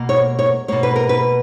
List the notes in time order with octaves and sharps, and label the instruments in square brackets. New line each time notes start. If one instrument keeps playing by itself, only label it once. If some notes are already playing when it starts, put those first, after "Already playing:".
Already playing: [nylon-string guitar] B2 A#3
C#5
C#5
B2 A#3 C#5
B4
A#4
B4